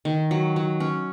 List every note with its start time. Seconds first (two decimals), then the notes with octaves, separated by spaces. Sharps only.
0.05 D#3
0.31 F#3
0.56 F#3
0.80 C#4